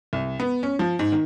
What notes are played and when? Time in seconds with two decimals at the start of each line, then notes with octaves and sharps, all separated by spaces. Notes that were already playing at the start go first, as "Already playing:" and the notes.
0.13 C2
0.40 B3
0.63 C#4
0.79 F3
0.99 G#2
1.12 D#3